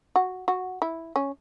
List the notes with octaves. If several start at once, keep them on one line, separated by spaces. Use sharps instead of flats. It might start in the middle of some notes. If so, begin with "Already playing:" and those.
F#4
F#4
E4
C#4